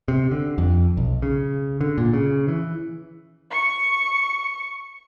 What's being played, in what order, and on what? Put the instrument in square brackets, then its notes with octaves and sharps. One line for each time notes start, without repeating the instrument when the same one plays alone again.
[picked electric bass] C3
D3
F2
B1
C#3
D3
A#2
C#3
E3
[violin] C#6 C#7